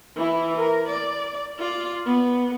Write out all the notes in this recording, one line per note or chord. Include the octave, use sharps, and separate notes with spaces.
E3 E4
A#4
D5
F4 D5
B3